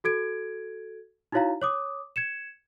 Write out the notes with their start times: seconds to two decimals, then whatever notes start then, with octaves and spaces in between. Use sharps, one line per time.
0.04 F#4 A4 G#6 D7
1.32 D#4 E4 F#4 C#5 F5 A#5
1.61 C#5 D6 D#6
2.16 G#6 C#7 E7